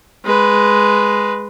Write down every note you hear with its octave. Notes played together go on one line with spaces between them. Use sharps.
G#3 B4